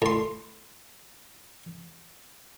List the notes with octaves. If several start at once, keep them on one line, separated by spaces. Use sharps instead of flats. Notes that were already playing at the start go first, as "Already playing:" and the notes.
A2 C6